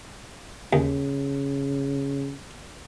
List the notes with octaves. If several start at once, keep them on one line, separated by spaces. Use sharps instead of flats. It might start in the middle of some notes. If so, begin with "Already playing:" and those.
D#2 C#3